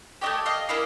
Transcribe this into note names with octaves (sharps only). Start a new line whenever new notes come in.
A3 D4 G4 C#5 D#5
D#5 F5
A#3 C#4 E4 D#5 F5